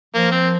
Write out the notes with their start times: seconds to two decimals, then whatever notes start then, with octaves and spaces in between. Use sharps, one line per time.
0.14 F3 A#3
0.31 C4